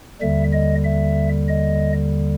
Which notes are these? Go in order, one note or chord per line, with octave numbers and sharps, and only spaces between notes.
D#2 D3 G3 E5
D#5
E5
D#5